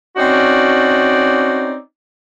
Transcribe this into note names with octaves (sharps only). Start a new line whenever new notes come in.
C4 C#4 D#4 F#4 D5